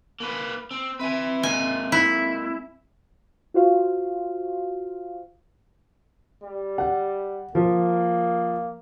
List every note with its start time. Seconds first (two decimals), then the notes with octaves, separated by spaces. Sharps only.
0.20 A#3 B4
0.71 C4
0.99 C4 B4 E5 G#5
1.43 G#3 A#3 G#5
1.92 E4
3.54 F4 F#4 C5 F5
6.43 G3
6.78 F#5
7.55 F3 A#3